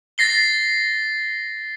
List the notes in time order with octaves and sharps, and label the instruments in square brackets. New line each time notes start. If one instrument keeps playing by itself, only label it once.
[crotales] A6 A#6 C7 G7